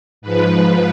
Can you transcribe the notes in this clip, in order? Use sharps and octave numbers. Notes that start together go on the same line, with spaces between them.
G#2 F3 B4